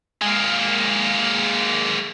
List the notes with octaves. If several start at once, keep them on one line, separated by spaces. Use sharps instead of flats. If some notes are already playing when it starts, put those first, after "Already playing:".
G#3 A#3